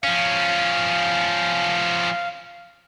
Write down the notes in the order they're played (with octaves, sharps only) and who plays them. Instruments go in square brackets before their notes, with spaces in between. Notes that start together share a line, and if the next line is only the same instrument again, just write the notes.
[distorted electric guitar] F3 C#4 [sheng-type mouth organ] F5